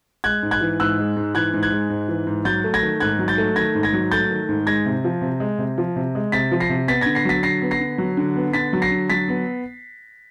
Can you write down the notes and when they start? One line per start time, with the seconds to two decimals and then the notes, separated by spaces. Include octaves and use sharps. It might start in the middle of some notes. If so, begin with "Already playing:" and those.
0.24 G#3 F#6 G#6
0.43 G#2
0.51 F#6 G#6
0.61 E3
0.80 G#2 E6 F#6
0.99 G#3
1.16 G#2
1.35 E3 F#6 G#6
1.54 G#2
1.63 F#6 G#6
1.72 G#3
1.90 G#2
2.08 E3
2.27 G#2
2.45 F#3 G6 A6
2.64 A3
2.74 G#6 A#6
2.82 D#3
3.00 G#2 F#6 G#6
3.19 F#3
3.28 G6 A6
3.38 A3
3.56 D#3 G#6 A#6
3.75 G#2
3.83 G#6 A#6
3.93 F#3
4.11 A3 G6 A6
4.31 D#3
4.49 G#2
4.66 G#3 G#6 A#6
4.86 C3
5.04 F3
5.22 C3
5.40 G#3
5.59 C3
5.78 F3
5.96 C3
6.15 G#3
6.32 C3 A6 B6
6.51 F3
6.60 A#6 C7
6.69 C3
6.88 B3 A6 B6
7.01 D3 G#6 A#6
7.15 A#6 C7
7.25 F#3 A6 B6
7.43 D3 A#6 C7
7.62 B3
7.71 A#6 C7
7.80 D3
7.98 F#3
8.17 D3
8.36 B3
8.53 D3 A6 B6
8.73 F#3
8.82 A#6 C7
8.91 D3
9.10 F#3 A6 B6
9.28 B3